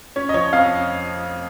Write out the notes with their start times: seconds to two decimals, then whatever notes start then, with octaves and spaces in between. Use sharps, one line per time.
0.16 C#4 C#5
0.29 D#5
0.34 F3 C#5
0.52 F2 F5